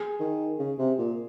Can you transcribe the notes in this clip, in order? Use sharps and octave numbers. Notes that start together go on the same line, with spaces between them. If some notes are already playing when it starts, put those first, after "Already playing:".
Already playing: G#4
D#3
C#3
C3
A#2